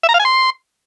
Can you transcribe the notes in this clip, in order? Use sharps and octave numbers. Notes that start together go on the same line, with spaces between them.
E5
A#5
F5
G#5
C6